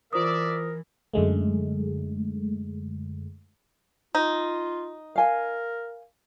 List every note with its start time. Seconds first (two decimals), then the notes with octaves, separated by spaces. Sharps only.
0.13 E3 F4 A#4 C5 D5 E5 D#6
1.14 F#2 D3 G#3 A3
4.15 D#4 F4
5.16 A#4 F5 G#5